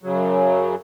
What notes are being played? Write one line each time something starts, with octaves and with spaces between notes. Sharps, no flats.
F#2 C#3 F#3